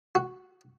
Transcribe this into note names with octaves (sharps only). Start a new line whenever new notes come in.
F#4